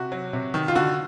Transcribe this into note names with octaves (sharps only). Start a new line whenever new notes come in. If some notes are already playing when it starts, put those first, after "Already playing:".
Already playing: C3 F#4
F#3
C3
D#3
F4
D3 F#4